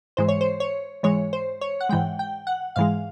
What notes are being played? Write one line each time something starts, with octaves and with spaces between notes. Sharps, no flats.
G#2 E3 G#3 C5
C#5
C5
C#5
G#2 E3 G#3 C#5
C5
C#5
F#5
G#2 E3 G#3 G5
G5
F#5
G#2 E3 G#3 F5